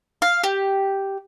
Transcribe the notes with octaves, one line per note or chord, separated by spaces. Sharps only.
F5
G4